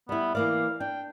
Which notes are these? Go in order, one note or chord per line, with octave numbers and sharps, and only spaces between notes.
G3 B3 E4
E3 A#3 D5 F5
D4 G5